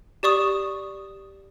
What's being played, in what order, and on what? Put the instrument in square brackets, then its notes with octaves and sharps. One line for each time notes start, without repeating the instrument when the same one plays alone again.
[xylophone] G4 D5 C#6 D#6